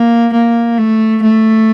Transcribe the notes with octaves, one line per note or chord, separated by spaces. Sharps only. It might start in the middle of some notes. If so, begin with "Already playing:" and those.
Already playing: A#3
A#3
A3
A3